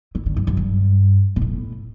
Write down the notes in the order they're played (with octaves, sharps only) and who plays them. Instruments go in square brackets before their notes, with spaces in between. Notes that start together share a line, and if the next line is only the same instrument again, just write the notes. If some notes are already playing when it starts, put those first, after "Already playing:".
[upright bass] E3
D3
F#2
F#2
G2
B2
A2